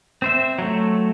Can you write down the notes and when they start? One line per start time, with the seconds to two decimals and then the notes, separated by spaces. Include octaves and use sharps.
0.22 C4 C5 E5
0.59 F#3 A3